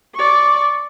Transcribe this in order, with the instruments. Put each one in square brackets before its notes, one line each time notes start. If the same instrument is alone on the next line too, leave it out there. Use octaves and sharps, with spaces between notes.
[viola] D5 C#6